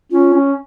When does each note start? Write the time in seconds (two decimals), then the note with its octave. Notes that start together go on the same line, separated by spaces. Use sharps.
0.11 C#4 F4
0.33 C#4